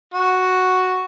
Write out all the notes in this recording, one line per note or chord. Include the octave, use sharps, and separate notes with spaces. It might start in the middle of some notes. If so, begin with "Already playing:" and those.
F#4